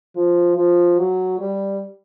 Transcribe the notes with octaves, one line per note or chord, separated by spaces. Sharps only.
F3
F3
F#3
G3